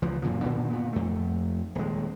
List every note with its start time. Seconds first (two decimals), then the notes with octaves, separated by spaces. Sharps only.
0.02 C#2 E3 F3
0.22 F#2 A#2 D3 F3
0.42 A#2 D3 D#3 B3
0.70 A#2 B3
0.93 F2 A3
1.75 D#1 G#3